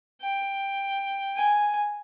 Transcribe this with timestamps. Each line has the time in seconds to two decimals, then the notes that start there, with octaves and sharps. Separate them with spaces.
0.22 G5
1.36 G#5